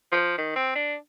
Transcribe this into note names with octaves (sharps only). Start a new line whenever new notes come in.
F3
D#3
C4
D4